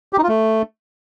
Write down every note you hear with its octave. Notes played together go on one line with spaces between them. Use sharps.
G4
D#4
F4
A3